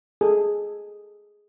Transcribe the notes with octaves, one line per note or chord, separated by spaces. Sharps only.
G#4 A4